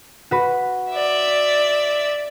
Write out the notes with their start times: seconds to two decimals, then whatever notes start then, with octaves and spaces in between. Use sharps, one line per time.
0.31 F#4 B4
0.90 D5 E5